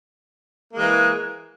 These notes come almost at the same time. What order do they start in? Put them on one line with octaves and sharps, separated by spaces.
A#3 G#3 E3